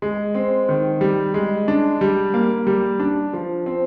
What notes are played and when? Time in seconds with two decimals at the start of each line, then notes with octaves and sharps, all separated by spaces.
0.02 G#3
0.35 C4
0.69 D#3
1.01 G3
1.34 G#3
1.68 D4
2.01 G3
2.34 A#3
2.67 G3
3.00 D4
3.33 F3
3.66 C4